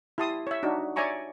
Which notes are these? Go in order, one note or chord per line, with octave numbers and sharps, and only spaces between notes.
E4 G4 A5 C6 D#6
C#5 E5
D4 D#4 F#4
C#5 D5 E5 G#5 A#5 C#6